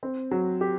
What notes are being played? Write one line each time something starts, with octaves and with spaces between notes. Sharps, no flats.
C4
F#3
G4